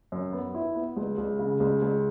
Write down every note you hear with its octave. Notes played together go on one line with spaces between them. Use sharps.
F#2
B3
E4
B3
C#2
C#2
C#3
C#2
C#2